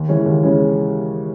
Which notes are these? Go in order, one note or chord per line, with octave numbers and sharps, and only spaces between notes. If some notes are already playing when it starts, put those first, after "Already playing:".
Already playing: D#2
C#3 E3 G#3 C#4
D#2
C#3 E3 G#3 C#4